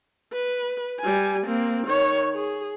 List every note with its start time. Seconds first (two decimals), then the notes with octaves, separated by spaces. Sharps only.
0.33 B4
1.00 G3 G#5
1.46 A#3 C4
1.87 D#3 C#5
2.35 G#4